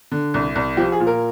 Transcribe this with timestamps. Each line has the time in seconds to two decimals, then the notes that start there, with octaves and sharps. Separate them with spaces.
0.12 D3
0.34 C2
0.55 C2
0.77 F3 G4
0.92 G#4
1.00 A#2
1.07 A#4